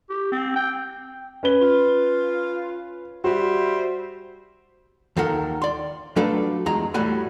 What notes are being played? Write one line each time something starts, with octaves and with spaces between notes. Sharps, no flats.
G4
C4
G5
C#4 B4 G7
F4
G3 F#4 C5 E5
D#2 D#3 A4 A#4 F#5
D5 C6
F#3 A3 D4 F4 A4 B4
E2 G#3 A#5
A2 G3 A3 F#4 G#5 B5